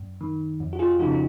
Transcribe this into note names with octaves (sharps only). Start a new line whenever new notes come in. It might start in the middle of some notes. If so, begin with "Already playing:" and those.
Already playing: F#2
D#3
F2
F#4
F4 G#4
C#3 F3 D#4 F#4
D#4